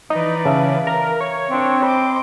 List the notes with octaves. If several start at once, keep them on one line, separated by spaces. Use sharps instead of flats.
E3 D#4 B4 D5
C#3 E5 F5 A5
A#4
C#5
C4 D4
C5 D#5 B5 C6 D6